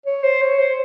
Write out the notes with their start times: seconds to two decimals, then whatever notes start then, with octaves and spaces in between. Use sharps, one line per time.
0.06 C#5
0.24 C5
0.42 C#5
0.59 C5